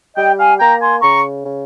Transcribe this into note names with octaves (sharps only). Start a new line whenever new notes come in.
G3 D#5 G5
F5 G#5
A#3 G5 A#5
G#5 C6
C#3 A#5 C#6
C#3